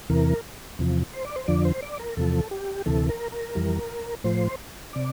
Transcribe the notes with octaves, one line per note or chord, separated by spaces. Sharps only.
E2 C3 E3 A#4
E2 C3 F3
C5
D5
C5
F2 D3 F3 D5
C5
D5
A#4
E2 C3 F3 A4
G4
D2 C3 E3 A4
A#4
A#4
F2 E3 G3
A2 F3 C5
C3 D5